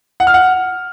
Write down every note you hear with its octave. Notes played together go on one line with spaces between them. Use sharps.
F#5
F6
F#5